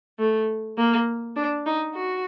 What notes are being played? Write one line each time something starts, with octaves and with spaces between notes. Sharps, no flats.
A3
A#3
D4
D#4
F#4